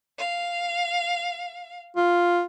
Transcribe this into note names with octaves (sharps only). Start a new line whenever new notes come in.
F5
F4